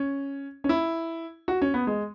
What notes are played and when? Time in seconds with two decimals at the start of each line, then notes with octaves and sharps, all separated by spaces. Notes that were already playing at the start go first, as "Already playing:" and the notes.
Already playing: C#4
0.64 C#4
0.69 E4
1.48 F#4
1.62 C#4
1.74 B3
1.87 G#3